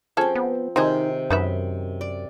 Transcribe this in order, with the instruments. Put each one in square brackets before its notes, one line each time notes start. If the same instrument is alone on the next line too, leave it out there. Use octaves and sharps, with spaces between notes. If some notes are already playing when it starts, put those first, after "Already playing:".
[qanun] F3 C4 [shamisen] C#4 G#4 A4
[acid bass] B3
[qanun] C3 D#3 [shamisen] C4 G#4 [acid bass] D#4
[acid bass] F#2 [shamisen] D#4 B4 E5
[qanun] D5